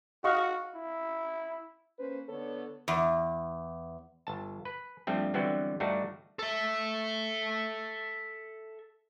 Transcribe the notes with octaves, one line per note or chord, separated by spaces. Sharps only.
F#4 D#5 F5 C#6
E4
A#3 C#4 B4 C5
D3 B3 A4 C#5
E2
G1 A5
B4
G2 F3 G3 A3 C4
D3 E3 F#3 G3 B3 C4
G2 G3 A3 D4 D#4 F#4
A4 E5